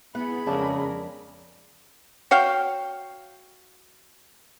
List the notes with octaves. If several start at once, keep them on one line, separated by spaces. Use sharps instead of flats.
B3 E4 G#4 F#5 B5
F2 C#3 G#3 D4 A#4
F#4 C#5 F5 G5